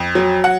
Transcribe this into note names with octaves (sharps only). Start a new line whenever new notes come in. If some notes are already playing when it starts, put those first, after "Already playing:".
Already playing: F2
F#3
F#5